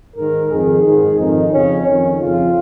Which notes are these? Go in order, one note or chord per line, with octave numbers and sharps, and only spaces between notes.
G#2 D#3 A#4
F2 D#3 G#4
G#2 D#3
F2 D#3 D#4
F2 C#3 C#4
F2 D#3 C#4
F2 C#3 F4